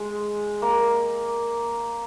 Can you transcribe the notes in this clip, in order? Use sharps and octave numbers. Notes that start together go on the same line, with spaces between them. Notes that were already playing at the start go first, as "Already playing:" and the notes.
Already playing: G#3
A#3